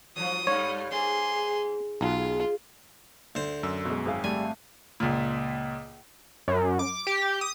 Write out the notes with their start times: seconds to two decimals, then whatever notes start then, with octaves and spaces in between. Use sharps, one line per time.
0.16 G2 F3 F#3 D#6
0.47 G2 G3 A3 C#5
0.91 G#2 G#4 C6
2.01 B1 G#3 F4
3.35 D2 C5
3.63 F#2 E6
3.85 B2 G#3
4.05 G#1 C4 G#4 F5
4.24 G3 A3 G#5
5.00 C#2 A#2
6.48 F#2
6.79 D6
7.07 G4
7.41 D#6